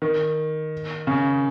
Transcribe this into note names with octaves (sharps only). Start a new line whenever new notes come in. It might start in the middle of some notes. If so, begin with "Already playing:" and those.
D#3
C#3